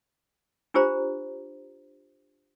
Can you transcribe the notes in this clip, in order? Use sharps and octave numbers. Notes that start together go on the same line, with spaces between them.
D4 F4 G4 C5 A#5